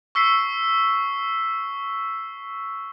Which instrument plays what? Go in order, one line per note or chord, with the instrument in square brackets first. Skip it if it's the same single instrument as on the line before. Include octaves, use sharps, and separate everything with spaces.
[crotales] C#6 E6 B6 C7